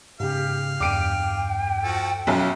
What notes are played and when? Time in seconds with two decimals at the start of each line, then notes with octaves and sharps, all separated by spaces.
0.20 G#2 C#3 G4 F5
0.80 E2 G2 G5 D6 D7 D#7
1.83 F3 F#4 A4
2.27 B1 F#2 E4 F4